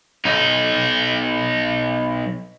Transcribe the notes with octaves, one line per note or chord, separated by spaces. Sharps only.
B1 D#4